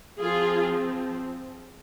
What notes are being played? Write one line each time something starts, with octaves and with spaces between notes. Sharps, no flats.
F3 C4 F4 G#4